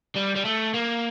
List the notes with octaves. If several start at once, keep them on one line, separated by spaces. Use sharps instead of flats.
G3
G3
A3
A#3